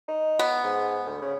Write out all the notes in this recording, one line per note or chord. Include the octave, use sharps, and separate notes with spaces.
D#4
B3
G#2
D2
C#3